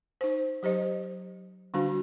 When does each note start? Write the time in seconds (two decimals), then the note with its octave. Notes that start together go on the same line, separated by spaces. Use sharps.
0.21 D#4 C5
0.63 F#3 G4 C5 D#5
1.74 D3 G3 D4 F#4